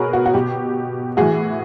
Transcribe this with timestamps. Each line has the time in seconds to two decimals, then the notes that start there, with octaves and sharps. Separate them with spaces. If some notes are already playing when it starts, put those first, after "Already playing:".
Already playing: B2 F#4 G#4 A#4 B4 C#5
0.13 F#4
0.26 F#4
0.34 B2 G4
1.17 A2 E3 F#4 G#4